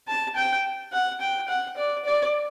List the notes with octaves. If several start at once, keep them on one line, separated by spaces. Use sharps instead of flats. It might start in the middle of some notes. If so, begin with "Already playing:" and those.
A5
G5
F#5
G5
F#5
D5
D5